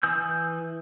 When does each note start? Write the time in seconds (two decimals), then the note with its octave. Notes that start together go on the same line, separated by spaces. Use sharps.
0.03 E3 G#5 D#6 E6 G6